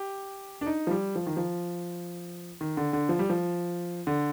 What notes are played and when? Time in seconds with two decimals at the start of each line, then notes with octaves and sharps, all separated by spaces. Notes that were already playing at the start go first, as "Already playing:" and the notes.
Already playing: G4
0.61 D4
0.66 D#4
0.87 F3
0.91 G3
1.15 F3
1.27 D#3
1.37 F3
2.61 D#3
2.77 D3
2.93 D3
3.09 F3
3.19 G3
3.30 F3
4.07 D3